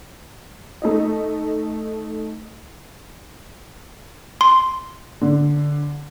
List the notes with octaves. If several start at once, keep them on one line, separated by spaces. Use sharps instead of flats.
A3 D#4 D#5
C6
D3